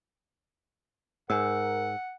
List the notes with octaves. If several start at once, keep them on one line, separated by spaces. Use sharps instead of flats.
G#2 A#4 F#5 G#5 E6